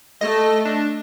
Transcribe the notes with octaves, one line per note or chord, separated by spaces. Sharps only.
A3 D#5
D4